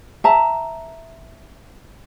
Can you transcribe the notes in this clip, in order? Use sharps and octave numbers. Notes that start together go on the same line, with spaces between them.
E5 A5 A#5